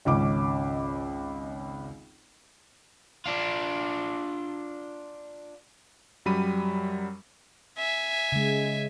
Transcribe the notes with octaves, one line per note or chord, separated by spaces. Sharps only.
G#1 C#2 C#4 D6
D4 F4
F#2 F#3 G3 B5 D#7
E5 G#5
C#3 G#3